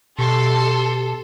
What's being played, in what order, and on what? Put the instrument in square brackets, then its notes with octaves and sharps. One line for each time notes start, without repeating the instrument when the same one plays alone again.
[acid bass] B2 [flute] G4 [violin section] A4 [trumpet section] C6